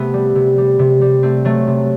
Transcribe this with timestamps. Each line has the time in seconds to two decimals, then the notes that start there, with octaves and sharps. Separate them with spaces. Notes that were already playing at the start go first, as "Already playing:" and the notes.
Already playing: C3 A3 B3
0.13 G3
0.35 C3
0.58 G3
0.79 C3
1.01 G3
1.23 A3 C4
1.45 F#3 A3
1.67 C3